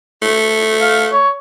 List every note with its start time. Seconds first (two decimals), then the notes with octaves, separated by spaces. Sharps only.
0.22 A3
0.81 F5
1.12 C#5